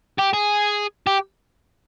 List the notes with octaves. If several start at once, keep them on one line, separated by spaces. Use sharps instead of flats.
G4
G#4
G4